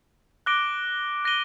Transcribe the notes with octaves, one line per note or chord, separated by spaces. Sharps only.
D6 F#6 A#6 D7 G7
F#6 A#6 D#7 G7